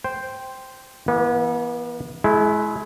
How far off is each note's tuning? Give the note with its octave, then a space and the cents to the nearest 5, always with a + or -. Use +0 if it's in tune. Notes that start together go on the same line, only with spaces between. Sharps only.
C5 -5 G5 +0
E3 +10 B3 -40
G#3 +35 E4 +0